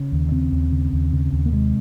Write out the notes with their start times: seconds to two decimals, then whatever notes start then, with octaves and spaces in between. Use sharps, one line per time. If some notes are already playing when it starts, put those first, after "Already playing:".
Already playing: C#3
0.12 D#2
0.32 C#3 C4
0.52 D#2
0.72 C#3
0.93 D#2
1.13 C#3
1.33 D#2
1.46 A#3
1.52 C3 G#3